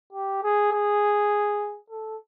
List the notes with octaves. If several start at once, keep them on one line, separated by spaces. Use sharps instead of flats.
G4
G#4
G#4
A4